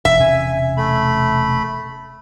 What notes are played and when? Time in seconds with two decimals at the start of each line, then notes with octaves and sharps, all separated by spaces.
0.05 E1 E5
0.20 E1 C3 C#4 G#5
0.77 A3 B5